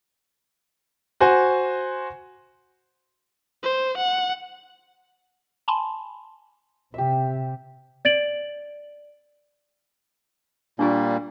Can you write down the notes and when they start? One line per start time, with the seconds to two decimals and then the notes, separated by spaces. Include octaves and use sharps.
1.20 F#4 C5 G#5
3.63 C5
3.98 F#5
5.68 G#5 A5 B5 C6
6.94 C3 G4 E5
8.05 D5 A6 D7 F#7
10.79 A#2 G3 A#3 D4 F4